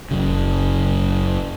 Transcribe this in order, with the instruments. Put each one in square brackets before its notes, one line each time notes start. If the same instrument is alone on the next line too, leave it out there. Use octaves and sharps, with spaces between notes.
[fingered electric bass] F#1 F#2 C#3